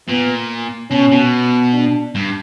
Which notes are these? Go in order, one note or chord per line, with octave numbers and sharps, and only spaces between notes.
A#2 B3
B2 C#4
B2
D4
G2